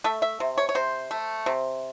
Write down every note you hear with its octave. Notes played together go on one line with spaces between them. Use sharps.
A3 E5
E5
C3
C#5
C#5
C3 C5
A3
C3